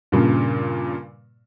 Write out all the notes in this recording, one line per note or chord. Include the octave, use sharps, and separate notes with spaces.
G2 A#2 C#3